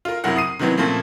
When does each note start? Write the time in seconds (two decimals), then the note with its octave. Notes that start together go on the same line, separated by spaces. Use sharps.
0.05 F4 A#4
0.24 F#1 C3 F#3 E4 A#4 F#5
0.36 D#6 C7 D#7
0.59 C3 D#3 E3 F#3 B3 C4
0.78 A#2 C#3 F3 A3 A#3 C4